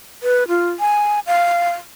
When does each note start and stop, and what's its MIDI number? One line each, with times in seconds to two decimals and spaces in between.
0.23 0.43 71
0.48 0.69 65
0.80 1.20 80
1.27 1.70 77